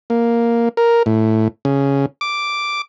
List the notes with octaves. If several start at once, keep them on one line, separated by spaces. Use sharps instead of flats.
A#3
A#4
A2
C#3
D6